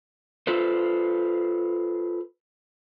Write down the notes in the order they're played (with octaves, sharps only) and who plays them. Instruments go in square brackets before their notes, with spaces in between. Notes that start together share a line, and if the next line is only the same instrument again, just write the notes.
[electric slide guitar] F4 A4 B4 C5